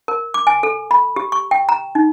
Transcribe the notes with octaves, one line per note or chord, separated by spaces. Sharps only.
A#4
D6
G#5
A4
B5
G4
C#6
G5
A#5
D#4